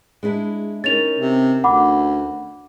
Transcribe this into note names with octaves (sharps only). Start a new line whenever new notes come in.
G#3 D4 E4
C#4 D#4 A#4 A6 F7
C3
D2 F#5 B5 D6